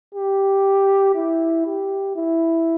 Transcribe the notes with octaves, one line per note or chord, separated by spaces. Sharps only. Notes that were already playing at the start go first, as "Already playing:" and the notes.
G4
E4
G4
E4